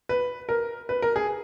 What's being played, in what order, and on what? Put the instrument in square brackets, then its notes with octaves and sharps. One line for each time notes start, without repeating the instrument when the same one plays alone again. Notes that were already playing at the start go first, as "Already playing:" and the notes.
[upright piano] B4
A#4
B4
A#4
G#4